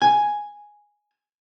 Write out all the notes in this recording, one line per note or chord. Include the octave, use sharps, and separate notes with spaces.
G#5